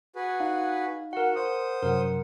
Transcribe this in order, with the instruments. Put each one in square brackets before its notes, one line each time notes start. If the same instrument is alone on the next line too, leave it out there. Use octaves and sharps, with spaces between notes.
[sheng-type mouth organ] F#4 G#4 B4
[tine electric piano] D#4 F5
[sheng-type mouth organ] F#4 [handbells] A#4 F#5
[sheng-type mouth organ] C5 D#6
[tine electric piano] F#2 C3 F#3 [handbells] A#4 F#5